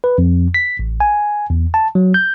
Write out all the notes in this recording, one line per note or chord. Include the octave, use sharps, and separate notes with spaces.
B4
F2
B6
A1
G#5
E2
A5
F#3
G6